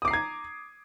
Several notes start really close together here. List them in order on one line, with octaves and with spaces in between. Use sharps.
D#6 D6 C7 A#5 G#6